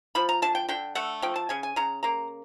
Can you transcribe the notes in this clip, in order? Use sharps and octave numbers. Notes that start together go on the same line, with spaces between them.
F3 B5
A#5
D3 A5
G5
D3 G5
A3 F#5
F3 G5
A5
C#3 G#5
G#5
C#3 A#5
A#3 A#5